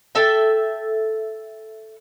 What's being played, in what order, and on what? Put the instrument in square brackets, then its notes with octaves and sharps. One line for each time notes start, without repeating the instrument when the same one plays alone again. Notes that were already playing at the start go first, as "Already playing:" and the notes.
[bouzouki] A4 E5 G5